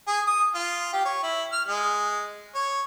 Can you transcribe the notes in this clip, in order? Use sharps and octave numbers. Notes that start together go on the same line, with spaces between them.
G#4
D#6
F4
G4
C#5
E4
F6
G#3
C#5